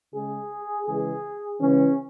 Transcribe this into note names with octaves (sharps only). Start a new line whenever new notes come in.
C#3 G#3 G#4
C#3 E3 G#3 G#4
C#3 E3 G#3 C#4